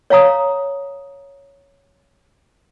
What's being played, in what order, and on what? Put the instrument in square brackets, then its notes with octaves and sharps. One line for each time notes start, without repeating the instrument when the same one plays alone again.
[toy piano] C#5 F5 A#5 D#6